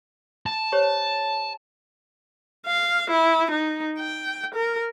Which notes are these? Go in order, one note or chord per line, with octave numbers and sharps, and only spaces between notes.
A5
G4 C5 C#5
F5
E4
D#4
G5
A#4